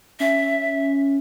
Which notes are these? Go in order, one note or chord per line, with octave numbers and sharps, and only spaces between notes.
C#4 E5